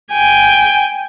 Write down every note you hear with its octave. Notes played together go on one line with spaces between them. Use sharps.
G5 G#5